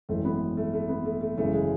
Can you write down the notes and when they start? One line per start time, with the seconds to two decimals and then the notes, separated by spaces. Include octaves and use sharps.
0.09 G#1 F#2 E3 A3
0.25 B3
0.57 A3
0.73 A3
0.89 B3
1.05 A3
1.21 A3
1.37 G#1 F#2 C#3 E3 A3
1.53 G#3